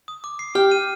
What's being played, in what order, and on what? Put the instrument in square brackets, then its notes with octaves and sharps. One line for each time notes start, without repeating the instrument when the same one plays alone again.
[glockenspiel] D#6
D6
C7
[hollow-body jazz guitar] G4 [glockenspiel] F6
[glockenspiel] D#7